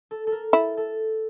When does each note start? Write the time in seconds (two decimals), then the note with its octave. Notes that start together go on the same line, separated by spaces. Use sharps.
0.11 A4
0.27 A4
0.32 A#4
0.53 E4 A4
0.77 A4